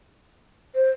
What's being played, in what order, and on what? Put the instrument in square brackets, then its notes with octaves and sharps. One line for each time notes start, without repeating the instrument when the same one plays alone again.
[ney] C5